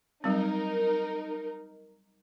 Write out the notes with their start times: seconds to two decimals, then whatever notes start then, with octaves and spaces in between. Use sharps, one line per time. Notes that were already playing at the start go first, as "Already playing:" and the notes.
0.24 F#3 G3 C4 D#4 A#4